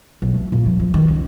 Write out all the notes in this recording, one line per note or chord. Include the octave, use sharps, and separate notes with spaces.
B1
A3
A#2
F3
F3
D#3
C#2